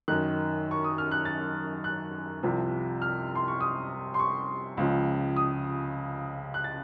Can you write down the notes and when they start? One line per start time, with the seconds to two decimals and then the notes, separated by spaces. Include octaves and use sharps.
0.08 F#2 D#3 F#6
0.71 C#6
0.84 D#6
0.98 F6
1.11 F#6
1.25 A6
1.84 F#6
2.43 C2 C3 F3
3.02 F6
3.35 C6
3.48 C#6
3.61 D#6
4.14 C6
4.19 C#6
4.77 C#2 C#3 F3
5.36 D#6
6.54 F#6
6.64 A6